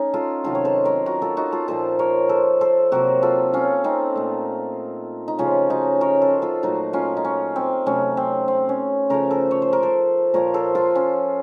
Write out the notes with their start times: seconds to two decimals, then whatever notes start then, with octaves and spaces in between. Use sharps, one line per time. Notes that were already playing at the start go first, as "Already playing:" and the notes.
Already playing: A3 C#4 D#4
0.14 F4 A4
0.44 C3 D#3 F#3 F4 A4
0.55 C#5
0.65 A4 C5
0.85 A#4 C#5
1.06 F#4 A#4
1.22 F4 A4
1.37 D#4 F#4
1.52 F4 A4
1.68 A#2 F3 A#3 A4 C5
1.99 A#4 C#5
2.29 A4 C5
2.61 A4 C5
2.92 C3 F#3 A#3 F#4 A#4
3.23 F4 A4
3.53 C#4 F4
3.84 C4 D#4
4.15 A#2 A3
5.28 D#4
5.38 C#3 F3 A3 C#4 F4
5.70 D#4 F#4
6.01 A#4 C#5
6.21 A4 C5
6.42 F4 A4
6.62 A#2 F#3 A3 D#4 F#4
6.93 C#4 F4
7.17 D#4
7.25 C#4
7.56 C4
7.86 C3 F#3 A3 C#4
8.17 C4
8.48 C4
8.69 C#4
9.10 C#3 F3 A3 A#4 C#5
9.30 A4 C5
9.51 C#5
9.62 C5
9.73 A#4
9.83 A4 C5
10.34 A#2 F3 A#3 A#4 C#5
10.54 A4 C5
10.75 F4 A4
10.95 C#4 F4